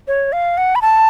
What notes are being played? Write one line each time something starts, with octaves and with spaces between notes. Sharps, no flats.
C#5
F5
F#5
B5
A5